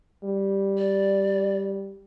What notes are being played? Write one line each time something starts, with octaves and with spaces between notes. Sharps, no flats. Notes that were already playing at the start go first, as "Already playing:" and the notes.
G3
D5